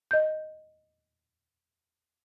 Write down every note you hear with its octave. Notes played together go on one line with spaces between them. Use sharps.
D#5 G6